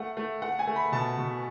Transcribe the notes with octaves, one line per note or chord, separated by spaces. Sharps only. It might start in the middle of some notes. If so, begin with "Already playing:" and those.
Already playing: A3 F#5
A3
A3 F#5
G#5
A3
B5
B2 A5
B2